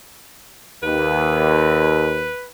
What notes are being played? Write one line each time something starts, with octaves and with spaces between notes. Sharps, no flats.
D#2 B4